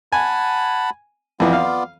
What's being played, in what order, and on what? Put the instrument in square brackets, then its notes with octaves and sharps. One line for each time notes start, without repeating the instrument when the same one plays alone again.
[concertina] F#5 A5 B5 [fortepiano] G#5
[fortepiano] F2 E3 [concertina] B3 F4 D5
[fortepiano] F5